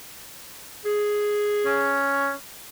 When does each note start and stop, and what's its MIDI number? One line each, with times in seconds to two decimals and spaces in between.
0.85 2.01 68
1.65 2.32 61